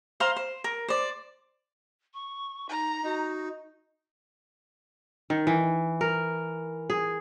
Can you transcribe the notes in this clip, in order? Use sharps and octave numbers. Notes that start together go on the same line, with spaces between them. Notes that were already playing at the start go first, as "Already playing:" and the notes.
C5 F5 A#5 C6
C5
A#4
C5 D5
C#6
D#4 A#5
D#4 F#4
D#3
E3
A#4
G#4